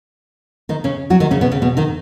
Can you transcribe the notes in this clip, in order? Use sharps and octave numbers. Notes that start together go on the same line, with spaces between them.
D#3 D#4
C#3 C#4
F#3 F#4
D#3 D#4
C#3 C#4
B2 B3
C#3 C#4
B2 B3
D#3 D#4